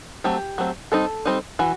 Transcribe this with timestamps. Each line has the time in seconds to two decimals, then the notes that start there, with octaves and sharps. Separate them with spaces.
0.24 F#3 A3 C4 G4
0.58 F#3 A3 C4
0.92 G3 C4 D#4 A4
1.25 G3 C4 D#4
1.59 E3 F#4